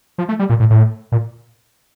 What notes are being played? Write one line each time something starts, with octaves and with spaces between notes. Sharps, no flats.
F3
A3
G3
A#2
A2
A2
A#2